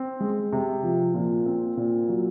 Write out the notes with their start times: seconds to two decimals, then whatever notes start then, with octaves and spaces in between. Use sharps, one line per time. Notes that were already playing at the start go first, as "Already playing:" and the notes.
Already playing: C4
0.21 G#3
0.53 C3
0.84 F3
1.14 A#2
1.46 C4
1.77 A#2
2.09 F#3